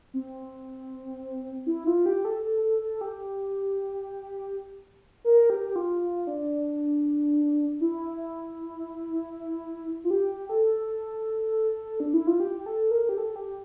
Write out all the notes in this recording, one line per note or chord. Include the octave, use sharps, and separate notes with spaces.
C4
E4
F4
G4
A4
A4
A4
A4
G4
A#4
G4
G4
F4
F4
D4
E4
F4
G4
A4
D4
E4
F4
G4
G4
A4
A#4
G4
A4
G4